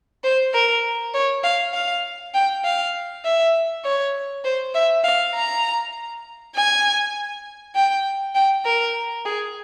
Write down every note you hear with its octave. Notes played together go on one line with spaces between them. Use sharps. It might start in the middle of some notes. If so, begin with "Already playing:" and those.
C5
A#4
C#5
F5
F5
G5
F5
E5
C#5
C5
E5
F5
A#5
G#5
G5
G5
A#4
G#4